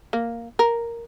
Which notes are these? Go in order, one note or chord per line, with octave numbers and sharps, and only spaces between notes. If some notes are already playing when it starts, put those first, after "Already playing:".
A#3
A#4